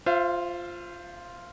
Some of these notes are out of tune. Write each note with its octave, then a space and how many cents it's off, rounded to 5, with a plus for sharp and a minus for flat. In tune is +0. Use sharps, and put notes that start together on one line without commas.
F4 +0 C5 +0 E5 +40